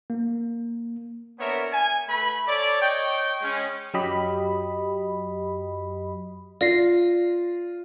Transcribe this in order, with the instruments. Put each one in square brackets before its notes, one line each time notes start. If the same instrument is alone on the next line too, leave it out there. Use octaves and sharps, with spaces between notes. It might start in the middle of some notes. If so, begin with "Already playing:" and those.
[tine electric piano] A#3
[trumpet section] B3 D4 A#4 C#5 E5
G#5
A3 B4 B5
A4 C#5 D5
C#5 D#5 G5
G#3 C#4
[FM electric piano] F#2 F#3 G4 D#5 B5
[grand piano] F4 [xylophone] D5 A#6 C7